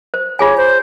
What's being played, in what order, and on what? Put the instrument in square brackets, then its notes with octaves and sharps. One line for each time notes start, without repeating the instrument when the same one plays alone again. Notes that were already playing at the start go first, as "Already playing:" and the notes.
[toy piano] C5
[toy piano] F4 G#4 G#5 [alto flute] C#5
[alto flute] C5